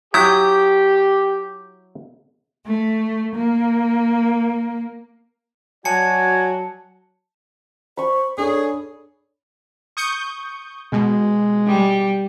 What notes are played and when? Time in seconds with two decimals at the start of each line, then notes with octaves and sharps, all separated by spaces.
0.14 F#3 E4 G4 D#6 G6
2.66 A3
3.35 A#3
5.85 F#3 F#4 D5 G#5 A5 C#7
7.97 C5 B5 C#6
8.38 D4 G#4 A4 C#5
9.97 C#6 D#6 G6
10.92 B2 G#3
11.67 G3